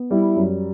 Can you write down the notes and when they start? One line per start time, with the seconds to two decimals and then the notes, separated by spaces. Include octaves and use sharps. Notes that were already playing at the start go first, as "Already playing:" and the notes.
Already playing: B3
0.11 G3 E4
0.36 F#2